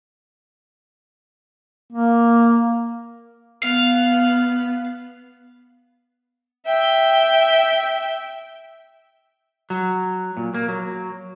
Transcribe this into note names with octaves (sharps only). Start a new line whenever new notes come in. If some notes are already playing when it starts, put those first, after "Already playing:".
A#3
B3 F5
E5 G5
F#3
A#2
A#3
F#3